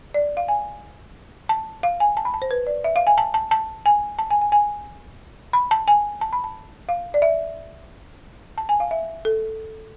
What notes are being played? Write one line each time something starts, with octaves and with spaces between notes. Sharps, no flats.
D5
F5
G#5
A5
F5
G#5
A5
B5
A5
C5
B4
D5
E5
F5
G#5
A5
A5
A5
G#5
A5
G#5
G#5
G#5
B5
A5
G#5
A5
B5
A5
F5
D5
E5
A5
G#5
F5
E5
A4